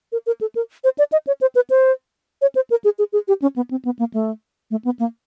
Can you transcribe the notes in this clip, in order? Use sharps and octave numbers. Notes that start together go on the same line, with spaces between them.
A#4
A#4
A4
A#4
C5
D5
D#5
C#5
C5
B4
C5
C#5
C5
A#4
G#4
G#4
G#4
G4
C#4
B3
C4
B3
A#3
A3
A3
B3
A#3